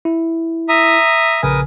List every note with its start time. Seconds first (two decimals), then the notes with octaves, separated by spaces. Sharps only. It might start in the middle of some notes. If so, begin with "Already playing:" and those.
0.05 E4
0.69 E5 A#5 D#6
1.43 A#1 C#3 A#4 B4 G#5 D#6